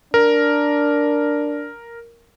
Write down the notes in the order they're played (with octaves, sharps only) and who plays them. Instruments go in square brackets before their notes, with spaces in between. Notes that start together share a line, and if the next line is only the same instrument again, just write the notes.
[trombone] D4 [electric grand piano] A#4